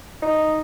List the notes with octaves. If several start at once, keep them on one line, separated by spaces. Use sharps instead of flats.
D#4